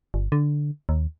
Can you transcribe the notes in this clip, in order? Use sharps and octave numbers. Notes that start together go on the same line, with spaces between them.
G1
D3
D#2